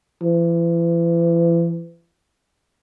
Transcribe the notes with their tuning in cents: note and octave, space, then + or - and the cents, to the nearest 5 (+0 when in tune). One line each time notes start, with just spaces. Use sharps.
E3 +40